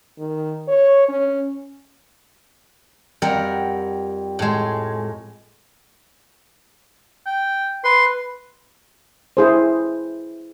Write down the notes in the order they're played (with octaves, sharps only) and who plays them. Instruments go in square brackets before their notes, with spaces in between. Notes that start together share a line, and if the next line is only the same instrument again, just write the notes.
[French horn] D#3
C#5
C#4
[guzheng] F2 G3 A#4 F#5
A2 G#3
[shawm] G5
[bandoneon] B4 [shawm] C6
[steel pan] E4 G#4 C5